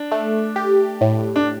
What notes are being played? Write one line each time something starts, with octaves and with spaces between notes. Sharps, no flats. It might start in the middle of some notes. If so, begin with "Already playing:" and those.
Already playing: D4
A3
G4
A2
D4